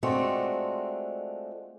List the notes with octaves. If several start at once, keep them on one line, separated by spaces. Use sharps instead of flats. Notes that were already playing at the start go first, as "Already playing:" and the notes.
G#3 A3 C4 D4 F4 F#4